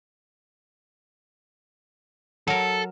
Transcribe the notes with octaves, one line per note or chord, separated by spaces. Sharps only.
F#3 A4 A#4